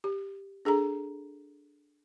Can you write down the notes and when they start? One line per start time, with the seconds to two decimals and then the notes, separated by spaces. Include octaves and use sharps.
0.04 G4
0.65 D4 G#4 A4 A#5